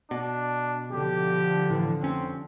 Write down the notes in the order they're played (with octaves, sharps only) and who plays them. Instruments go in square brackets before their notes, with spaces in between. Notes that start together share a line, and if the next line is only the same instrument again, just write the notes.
[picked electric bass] B2 [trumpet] D4
[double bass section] D3 F3 [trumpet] G4
[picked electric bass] A2 E3
[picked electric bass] F1 C#4 [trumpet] C4